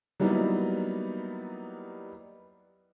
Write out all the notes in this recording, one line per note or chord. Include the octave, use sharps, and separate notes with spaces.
F#3 G3 A#3 B3 D#4 E4